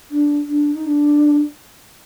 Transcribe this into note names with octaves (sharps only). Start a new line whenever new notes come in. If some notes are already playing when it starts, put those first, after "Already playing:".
D4
D4
D#4
D4